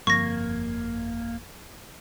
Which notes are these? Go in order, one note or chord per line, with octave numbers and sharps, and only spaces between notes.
G1 F2 A#3 C#6 G#6 A#6